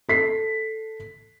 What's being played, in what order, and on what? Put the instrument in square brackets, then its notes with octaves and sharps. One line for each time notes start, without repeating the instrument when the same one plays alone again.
[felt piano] A4 B6 C7